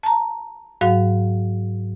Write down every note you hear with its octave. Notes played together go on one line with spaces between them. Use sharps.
A5 A#5
G#2 F#3 F#4 F5